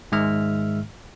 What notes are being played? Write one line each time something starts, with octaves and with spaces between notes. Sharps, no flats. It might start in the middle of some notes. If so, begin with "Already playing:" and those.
G#2 D#3 G#3 E5 F6